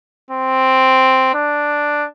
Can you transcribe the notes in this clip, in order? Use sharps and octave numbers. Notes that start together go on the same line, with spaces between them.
C4
D4